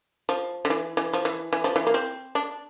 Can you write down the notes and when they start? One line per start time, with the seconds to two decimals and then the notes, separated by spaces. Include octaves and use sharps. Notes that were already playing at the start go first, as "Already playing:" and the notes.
0.29 F3
0.65 D3
0.70 E3
0.97 E3
1.13 F3
1.25 E3
1.53 E3
1.64 F3
1.76 E3
1.87 A#3
1.94 C4
2.35 D4